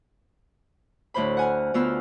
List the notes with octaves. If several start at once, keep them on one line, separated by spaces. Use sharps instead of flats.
D2 A2 C5 B5
F#5 G#5 F6
D2 B3 F4 E6 F6